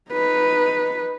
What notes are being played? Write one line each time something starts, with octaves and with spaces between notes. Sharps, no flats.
D#4 B4